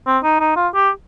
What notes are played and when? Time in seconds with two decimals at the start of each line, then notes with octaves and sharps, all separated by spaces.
0.07 C4
0.23 D#4
0.40 D#4
0.56 F4
0.74 G4